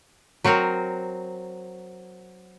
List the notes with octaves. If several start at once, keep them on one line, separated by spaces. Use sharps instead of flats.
F#3 C4 F#4 A#4